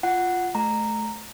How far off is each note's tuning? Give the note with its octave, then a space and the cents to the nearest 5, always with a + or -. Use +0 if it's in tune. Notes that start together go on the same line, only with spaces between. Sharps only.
F4 +0 F#5 +0
A3 -25 A#5 -10